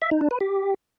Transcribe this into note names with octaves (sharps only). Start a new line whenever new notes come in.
E5
D#4
D4
B4
G4